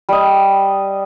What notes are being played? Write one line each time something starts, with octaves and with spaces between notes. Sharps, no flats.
G3 D#5